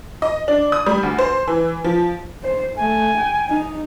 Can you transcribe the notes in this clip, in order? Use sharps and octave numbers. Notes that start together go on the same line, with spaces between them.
D#5
D4
D#6
G3
D2
C5
E3
F3
C5
A3 G#5
G5
D#4